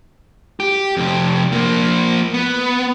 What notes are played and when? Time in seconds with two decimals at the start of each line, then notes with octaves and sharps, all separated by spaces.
0.60 G4
0.96 F2 C3
1.52 F3 A#3
2.34 B3